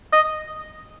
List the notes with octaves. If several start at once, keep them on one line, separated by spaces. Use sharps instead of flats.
D#5